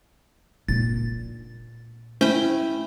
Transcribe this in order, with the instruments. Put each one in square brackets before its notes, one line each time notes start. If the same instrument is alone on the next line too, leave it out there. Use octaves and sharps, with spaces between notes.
[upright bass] A#2 D4 [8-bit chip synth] A6
[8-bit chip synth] A3 C#4 C5 [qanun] E4 G5